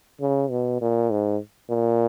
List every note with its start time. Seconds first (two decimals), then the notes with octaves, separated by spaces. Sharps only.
0.21 C#3
0.50 B2
0.81 A#2
1.11 G#2
1.70 A#2